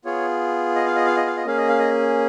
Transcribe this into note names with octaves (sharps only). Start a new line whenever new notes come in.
B3 F4 G#4 C#5
D#5
F5
D#5
F5
D#5
F5
D#5
A#3 C#4 G#4 F5
D#5
F5
D#5